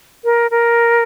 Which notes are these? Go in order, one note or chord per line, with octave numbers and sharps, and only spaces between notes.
A#4
A#4